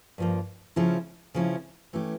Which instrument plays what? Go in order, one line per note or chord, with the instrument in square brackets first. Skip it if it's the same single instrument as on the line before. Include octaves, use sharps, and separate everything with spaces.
[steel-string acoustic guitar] G2 F3 A#3
C#3 F3 C#4 E4
C#3 F3 C#4 E4
E3 A3 C#4 G4